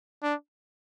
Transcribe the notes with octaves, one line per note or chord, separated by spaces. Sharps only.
D4